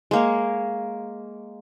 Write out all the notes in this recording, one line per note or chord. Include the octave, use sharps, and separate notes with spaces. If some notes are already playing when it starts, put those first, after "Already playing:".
G#3 A#3 C#5